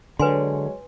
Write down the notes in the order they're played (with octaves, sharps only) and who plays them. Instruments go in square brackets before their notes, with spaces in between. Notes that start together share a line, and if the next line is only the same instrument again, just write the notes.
[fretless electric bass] D3 [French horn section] F#3 G#3 C#5 [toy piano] B4 G#5 C6